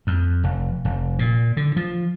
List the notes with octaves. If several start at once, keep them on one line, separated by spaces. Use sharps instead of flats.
F2
F1
F1
A#2
D3
F3